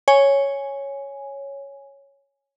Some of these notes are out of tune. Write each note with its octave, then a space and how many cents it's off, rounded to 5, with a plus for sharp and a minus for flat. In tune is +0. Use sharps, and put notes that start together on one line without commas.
C#5 +0 G#5 +0